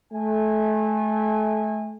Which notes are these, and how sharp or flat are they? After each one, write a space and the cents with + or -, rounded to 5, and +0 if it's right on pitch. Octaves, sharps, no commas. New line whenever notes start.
A3 -30 G#5 -30